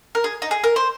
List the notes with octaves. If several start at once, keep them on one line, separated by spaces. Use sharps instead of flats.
A#4
G#4
D#4
G#4
A#4
C5